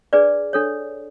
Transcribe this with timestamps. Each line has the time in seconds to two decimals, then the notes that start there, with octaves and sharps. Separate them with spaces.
0.13 D4 G#4 B4 D5
0.53 D4 A4 C#5